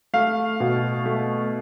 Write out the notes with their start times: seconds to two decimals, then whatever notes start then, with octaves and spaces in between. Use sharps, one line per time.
0.14 A3 F5
0.60 B2
1.06 A3